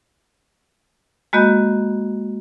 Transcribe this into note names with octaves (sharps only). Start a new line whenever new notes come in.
G#3 A#3 F#4 D#5 B5 G6